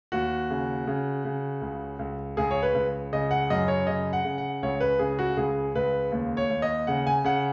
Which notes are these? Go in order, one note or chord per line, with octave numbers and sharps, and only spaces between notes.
D#2 F#4
C#3
C#3
C#3
C#2
C#2
C#2 G#4
C#5
B4
C#2
C#3 D#5
F#5
F#2 D#5
C#5
C#3 D#5
F#5
C#3
F#5
C#2 C#5
B4
C#3 G#4
F#4
C#2 G#4
C#2 B4
D#2
C#5
D#2
D#5
C#3 F#5
G#5
C#3 F#5